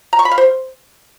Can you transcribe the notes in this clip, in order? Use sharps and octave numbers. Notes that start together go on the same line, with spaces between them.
A#5
C#6
B5
F5
C5